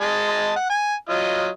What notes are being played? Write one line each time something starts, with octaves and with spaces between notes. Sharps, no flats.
G#3 D#5 A5
F#5
G#5
F#3 F4 D#5